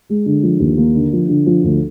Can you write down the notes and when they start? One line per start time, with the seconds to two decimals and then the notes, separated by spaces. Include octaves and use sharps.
0.09 G#3
0.26 D3
0.43 F3
0.60 D#2
0.77 A#3
0.95 D3
1.13 F3
1.29 D3
1.46 F3
1.64 D2